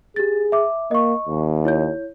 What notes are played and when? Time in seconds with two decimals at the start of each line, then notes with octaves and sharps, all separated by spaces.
0.16 G4 G#4 A6
0.52 E5 D6
0.91 A#3 D#5 C#6
1.28 D#2
1.65 E4 C#5 G6